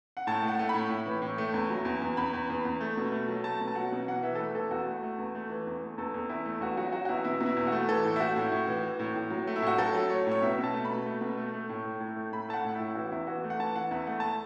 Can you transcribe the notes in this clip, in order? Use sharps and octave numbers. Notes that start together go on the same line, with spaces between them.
F#5
A2 A5
A3
F#5
A3
B5
A2
A2
E3
A2
A3
E2
F#3
E2
E2
E2 B5
E2
E2
E2
A3
B2
A3
F#3
A3 A5
B2
A5
F#3 F#5
B2
E3 F#5
E3 E5
A4
A3 B4
E3 A4
E2 F#4
A3
A3
E2
A3
E3
E2
A3
E2 A4
E2
E2 E4
A3
E2 F#4
F#3 F#4
F#3 F#4
F#4
E2 E4
B2 E4
B2
E4
E2
F#4
A3
E3 A4
A2
E4
A3 F#4
A2
A2
E3
E3
A2
A2
F#3
A3
E4
A2 F#4
F#3 A4
F#3
A3 C#5
A2 C#5
B2 E5
B2
A5
A3
B5
B2
A3
B2
A3
A3
A2
A3
A2
A3
A2 B5
A3 F#5 A5
A2
A2 E4
E3 F#4
E2 E4
E3 F#4
A3
F#5
E3 A5
E3 F#5
E2 E5
A3 F#5
A3 A5